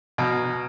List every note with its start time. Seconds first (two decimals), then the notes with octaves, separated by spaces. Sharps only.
0.18 B2 A#5 F6 G#6